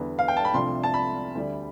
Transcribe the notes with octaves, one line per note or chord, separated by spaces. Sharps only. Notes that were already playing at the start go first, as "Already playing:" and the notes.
Already playing: E2 D3 G3 B3
F5
G5
A5
B5
C2 C3 F3 A3 D4 C6
A5
B5
D2 D3 G3 D4